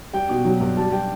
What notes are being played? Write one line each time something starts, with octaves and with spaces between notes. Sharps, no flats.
G3 G5
B2
F#3
G2
G3 A5
G3 G5